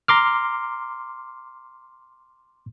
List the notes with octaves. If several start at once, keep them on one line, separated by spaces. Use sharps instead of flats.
A#5 C6 D6 F6